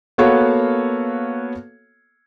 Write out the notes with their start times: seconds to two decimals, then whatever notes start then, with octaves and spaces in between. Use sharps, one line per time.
0.18 A#3 B3 F#4 A4 C#5 F5